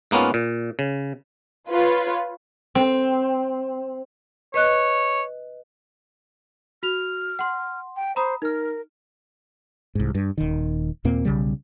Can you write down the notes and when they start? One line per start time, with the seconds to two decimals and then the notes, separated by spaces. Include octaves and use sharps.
0.11 G#2 A#3 B3 C#4 F4
0.34 A#2
0.79 C#3
1.69 F4 B4 C#5
2.75 C4
4.54 B4 C#5 D#5 F#6
6.83 F#4 F6 F7
7.39 F#5 C6
7.96 G5
8.16 C5 A#5 B5 D#6
8.42 D#4 A#4 F6
9.95 C2 G#2
10.15 G2
10.38 D#1 D#3
11.05 D#2 A#2 A#3 C4
11.25 B1 C#3 G3